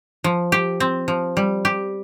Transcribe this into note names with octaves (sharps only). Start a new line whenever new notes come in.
F3
G4
C4
F3
G3
G4